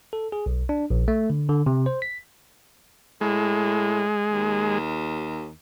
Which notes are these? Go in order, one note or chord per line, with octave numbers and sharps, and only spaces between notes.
A4
G#4
B1
D4
A#1
A3
D3
D3
C3
C5
B6
A2 G#3
D#2